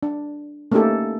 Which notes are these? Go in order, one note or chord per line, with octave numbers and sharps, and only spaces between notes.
D4
A3 A#3 C#4 D#4 G4 A4